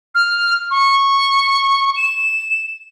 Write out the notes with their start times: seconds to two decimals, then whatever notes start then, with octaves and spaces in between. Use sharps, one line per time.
0.15 F6
0.71 C#6
1.97 E7